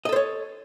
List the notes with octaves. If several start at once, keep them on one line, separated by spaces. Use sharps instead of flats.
A4 C5 C#5 D#5